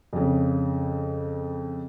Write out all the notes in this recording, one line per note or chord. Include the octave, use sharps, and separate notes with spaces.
F2 C#3